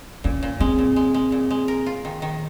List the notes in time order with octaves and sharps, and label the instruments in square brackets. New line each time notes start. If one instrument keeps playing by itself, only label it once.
[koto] A#2 [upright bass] C#4
[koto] A#2
[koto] G#3 [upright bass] C4
[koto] A#2
G#3
G#3
A#2
G#3
A#4
F4
D#3
D#3